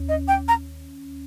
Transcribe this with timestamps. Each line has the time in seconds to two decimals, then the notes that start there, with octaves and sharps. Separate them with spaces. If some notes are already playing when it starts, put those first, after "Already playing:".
Already playing: D#2 C#4
0.09 D#5
0.28 G5
0.48 A#5